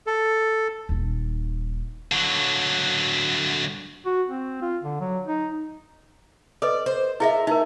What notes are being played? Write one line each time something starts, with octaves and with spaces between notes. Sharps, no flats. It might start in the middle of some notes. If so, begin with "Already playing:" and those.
A4
D#1 D#4
D3 F#3
F#4
C4
F4
D3
F#3
D#4
A4 B4 D5 D#5
C5
E4 F4 G#4 A#4 D#5 E5
A3 D#4 E4 A#4